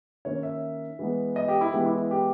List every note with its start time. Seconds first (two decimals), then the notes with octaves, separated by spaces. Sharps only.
0.25 D#3 A#3 C#4 C#5
0.43 E5
0.99 E3 G#3 B3
1.36 D#5
1.48 G4
1.61 E4
1.73 E3 G#3 B3 G4
1.86 E4
2.11 G4